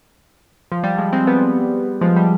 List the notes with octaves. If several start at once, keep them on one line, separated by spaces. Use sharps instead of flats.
F3
G3
F3 G#3
G#3 C4
G3 B3
F3 G#3
G3